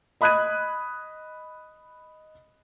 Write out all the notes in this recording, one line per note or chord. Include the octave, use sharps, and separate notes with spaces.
D#5 B5 D#6 F#6 G#6 D#7